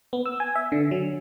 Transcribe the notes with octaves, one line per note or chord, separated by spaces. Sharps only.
B3
E6
G#5
E5
D3
F#3